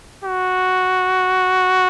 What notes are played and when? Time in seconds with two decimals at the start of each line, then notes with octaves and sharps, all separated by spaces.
0.24 F#4